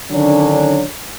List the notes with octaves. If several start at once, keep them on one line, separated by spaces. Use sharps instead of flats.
D3 D#3 F#3 C#4 D4